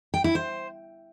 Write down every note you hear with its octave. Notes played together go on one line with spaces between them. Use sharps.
G5
E4
C5